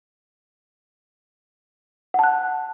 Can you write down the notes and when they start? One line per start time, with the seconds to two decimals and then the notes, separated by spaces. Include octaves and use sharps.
2.14 F#5
2.19 A5
2.24 F#6